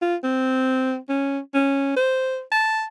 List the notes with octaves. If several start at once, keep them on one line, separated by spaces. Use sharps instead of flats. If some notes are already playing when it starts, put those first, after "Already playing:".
F4
C4
C#4
C#4
C5
A5